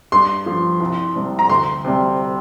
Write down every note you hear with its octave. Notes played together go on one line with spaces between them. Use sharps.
G2 C6
F3
C2
C3 G3
A#5
D2 C6
C3 G3